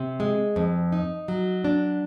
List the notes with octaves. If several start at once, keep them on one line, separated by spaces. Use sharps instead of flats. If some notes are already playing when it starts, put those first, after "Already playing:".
Already playing: C3
G#3
F2
D#4
F#3
D4